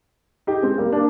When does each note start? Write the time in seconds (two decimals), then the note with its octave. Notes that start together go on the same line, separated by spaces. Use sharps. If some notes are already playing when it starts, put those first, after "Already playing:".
0.47 D#4 G4
0.62 G#3 C4
0.78 G3 A#3
0.92 A#3 D4